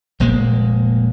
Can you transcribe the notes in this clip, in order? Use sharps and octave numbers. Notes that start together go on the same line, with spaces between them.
F1 A#2 G#3 A#3